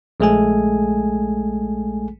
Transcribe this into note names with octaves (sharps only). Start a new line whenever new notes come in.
A#1 G#3 A3 G#4 A4 G#5